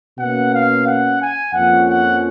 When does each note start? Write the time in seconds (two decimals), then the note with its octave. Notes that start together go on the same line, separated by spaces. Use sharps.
0.19 B2 A#3 C#4 F#5
0.52 F5
0.86 F#5
1.19 G#5
1.53 F2 F3 A#3 C#4 F#5
1.87 F#5